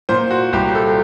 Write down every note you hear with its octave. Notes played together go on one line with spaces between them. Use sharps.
A#2 C5
F#4
C2 G4
A4